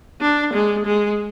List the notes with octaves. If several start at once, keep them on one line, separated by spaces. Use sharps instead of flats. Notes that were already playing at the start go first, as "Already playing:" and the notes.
D4
G#3
G#3